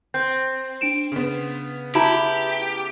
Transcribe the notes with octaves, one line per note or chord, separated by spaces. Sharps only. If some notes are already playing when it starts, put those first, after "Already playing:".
C4 G6
D4 D7 E7
C#3 B3
E4 F#4 G4 A5 A#5